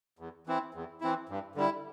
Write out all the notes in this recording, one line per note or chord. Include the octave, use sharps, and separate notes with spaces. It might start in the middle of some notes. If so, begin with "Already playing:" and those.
E2
E3 C4 E4
E2
E3 C4 E4
G2
D3 G3 E4